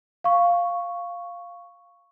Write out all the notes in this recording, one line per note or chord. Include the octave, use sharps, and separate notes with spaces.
F5 C#6